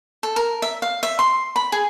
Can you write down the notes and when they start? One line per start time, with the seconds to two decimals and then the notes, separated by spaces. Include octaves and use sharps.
0.23 A4
0.36 A#4
0.62 E5
0.82 F5
1.03 E5
1.19 C6
1.56 B5
1.72 G#4